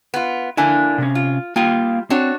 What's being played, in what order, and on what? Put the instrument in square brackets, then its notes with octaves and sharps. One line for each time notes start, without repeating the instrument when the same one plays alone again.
[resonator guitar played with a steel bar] B3 F4
[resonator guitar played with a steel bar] D3 A#3 D4 [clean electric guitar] E4 G#5
[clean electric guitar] C3 C#4
[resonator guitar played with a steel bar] F4
[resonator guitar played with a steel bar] G3 F4 [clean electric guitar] A#3 F5 G5
[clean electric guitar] C4 [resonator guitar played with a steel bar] D4 F#4 C#5